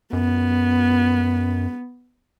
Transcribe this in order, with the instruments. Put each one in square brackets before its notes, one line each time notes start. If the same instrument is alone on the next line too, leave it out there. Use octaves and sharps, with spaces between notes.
[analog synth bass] F#2 [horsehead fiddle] B3